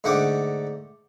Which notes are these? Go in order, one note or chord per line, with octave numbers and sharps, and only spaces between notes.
G#2 D3 A3 F#5 G5 D6